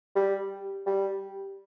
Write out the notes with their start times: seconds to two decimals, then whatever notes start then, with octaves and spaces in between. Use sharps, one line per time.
0.16 G3
0.86 G3